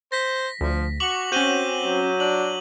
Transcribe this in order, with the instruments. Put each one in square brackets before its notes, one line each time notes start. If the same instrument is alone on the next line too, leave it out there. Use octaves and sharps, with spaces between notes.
[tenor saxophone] C5 [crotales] A#6 B6
[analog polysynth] D2 [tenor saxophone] F3
[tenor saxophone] F#4 [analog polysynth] C#6 [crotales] D6 F#7
[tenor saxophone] C4 [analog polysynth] C#4 F#4 [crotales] G6 D#7 G7
[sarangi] F#3
[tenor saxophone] D4 [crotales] F#7